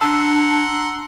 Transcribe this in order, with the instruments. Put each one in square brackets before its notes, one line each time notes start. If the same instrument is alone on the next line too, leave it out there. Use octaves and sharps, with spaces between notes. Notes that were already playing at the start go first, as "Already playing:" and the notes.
[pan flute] D4 [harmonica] F#5 A#5 C6 [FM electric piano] A5 E6